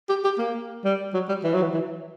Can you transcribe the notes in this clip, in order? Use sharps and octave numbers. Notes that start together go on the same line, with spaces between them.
G4
G4
A#3
G3
F#3
G3
E3
F#3
E3
E3